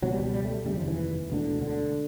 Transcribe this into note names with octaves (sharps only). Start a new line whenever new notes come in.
C#2 B2 F#3
G3
G3
G3
A3
F1 D#2 C#3 G3
F3
E3
E1 D2 D3
D3